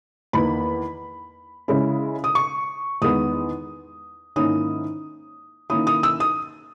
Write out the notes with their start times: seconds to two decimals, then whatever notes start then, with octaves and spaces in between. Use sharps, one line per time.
0.33 E2 D#3 A#3 D#4 B5
1.68 C#3 G#3 C#4 E4
2.24 D#6
2.35 C#6
3.02 E2 D#3 G#3 B3 D#6
4.36 G#2 D#3 A#3 C#4 E4 D#6
5.70 D#3 A#3 C#4 E4 D#6
5.87 D#6
6.03 E6
6.20 D#6